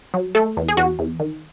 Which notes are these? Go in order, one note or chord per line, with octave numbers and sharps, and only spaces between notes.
F#3
A3 A4
E2
G#4
E2 F#4
E2
D#3